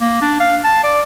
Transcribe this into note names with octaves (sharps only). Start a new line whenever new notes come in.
A#3
D4
F5
A5
D5